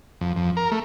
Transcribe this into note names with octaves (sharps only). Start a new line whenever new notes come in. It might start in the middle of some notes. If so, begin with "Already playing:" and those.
F2
F2
A#4
A3